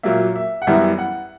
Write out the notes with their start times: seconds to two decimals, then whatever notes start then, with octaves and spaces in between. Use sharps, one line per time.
0.03 A#2 F#3 A#3 E5
0.36 E5
0.62 F#5
0.67 F#2 E3 G3 B3 E5
0.98 F#5